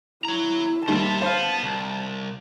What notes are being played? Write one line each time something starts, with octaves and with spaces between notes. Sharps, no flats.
E4 C#5 A#5
D#2 G3 C5 E5 A5
B3 C5 F5
C2